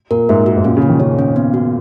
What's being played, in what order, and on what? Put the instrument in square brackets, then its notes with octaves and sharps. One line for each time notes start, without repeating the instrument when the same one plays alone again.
[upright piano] A#2 [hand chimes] A#4
[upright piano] G#2 [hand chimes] E5
[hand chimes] F#4
[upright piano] G#2
[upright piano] A#2 [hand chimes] C#4
[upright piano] C#3
[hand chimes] G#4
[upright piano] D#3
[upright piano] C#3 [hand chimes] C#5
[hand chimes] C#4
B3
F#4